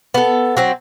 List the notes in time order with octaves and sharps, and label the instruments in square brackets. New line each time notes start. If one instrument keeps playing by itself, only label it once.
[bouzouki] B3 A4
F#3 C4